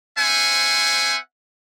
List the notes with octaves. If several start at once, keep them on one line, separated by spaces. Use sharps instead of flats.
C4 C5 E5 F#5 G#5